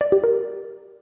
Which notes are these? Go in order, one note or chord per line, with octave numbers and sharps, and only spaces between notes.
D5
G4
A#4